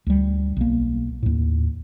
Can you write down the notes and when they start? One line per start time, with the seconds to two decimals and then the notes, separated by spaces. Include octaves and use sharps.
0.07 D2 G3
0.57 B1 A#3
1.23 D#2 A2